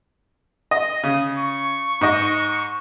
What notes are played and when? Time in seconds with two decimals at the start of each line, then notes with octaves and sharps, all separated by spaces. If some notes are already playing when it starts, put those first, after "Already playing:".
0.71 D#5
1.03 C#3 D#6
1.38 C#6
2.01 G#2 D#5